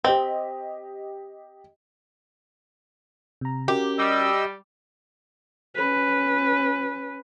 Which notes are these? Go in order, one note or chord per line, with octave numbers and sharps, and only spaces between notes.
C4 G4 D#5
C3 A#5
C#4 F#4 G4 A#4
G3 D#5 E6
C#4 B4